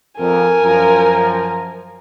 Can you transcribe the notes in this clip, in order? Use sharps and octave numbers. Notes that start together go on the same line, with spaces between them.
F2 A#4 G#5
F#2 F3 A#5